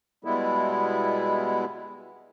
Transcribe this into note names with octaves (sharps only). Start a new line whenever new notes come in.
B2 G3 G#3 B3 E4